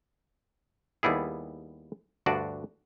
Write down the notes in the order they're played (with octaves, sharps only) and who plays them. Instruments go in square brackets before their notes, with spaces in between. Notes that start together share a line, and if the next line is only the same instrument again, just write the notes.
[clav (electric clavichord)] D#2 G3 B3 E4 G#4
D2 G2 D4 F#4 D5